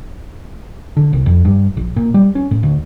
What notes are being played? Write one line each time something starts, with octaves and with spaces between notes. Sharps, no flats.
D3
C2
F2
G2
A#1
A#2
G3
C#4
A2
D2